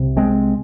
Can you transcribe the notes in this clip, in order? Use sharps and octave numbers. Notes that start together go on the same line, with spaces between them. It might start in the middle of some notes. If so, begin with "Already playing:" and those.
Already playing: C2 C3
G#3 C4